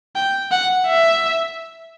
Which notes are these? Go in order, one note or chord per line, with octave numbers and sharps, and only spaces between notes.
G5
F#5
E5